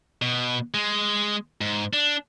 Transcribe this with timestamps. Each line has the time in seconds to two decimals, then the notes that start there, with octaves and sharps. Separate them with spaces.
0.22 B2
0.74 G#3
1.61 G#2
1.93 D4